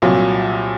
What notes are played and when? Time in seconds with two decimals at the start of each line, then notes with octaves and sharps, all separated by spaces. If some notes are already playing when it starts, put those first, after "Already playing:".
0.02 C2 A#2 F#3